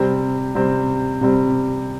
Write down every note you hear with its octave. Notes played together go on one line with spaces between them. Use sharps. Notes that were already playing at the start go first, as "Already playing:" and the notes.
Already playing: C3 G3 C4
C3 G3 C4
C3 G3 C4